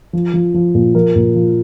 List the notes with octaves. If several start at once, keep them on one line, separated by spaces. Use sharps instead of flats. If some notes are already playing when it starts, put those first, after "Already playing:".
F3
F3
F3
A#2
F3 A#4
A#2
F3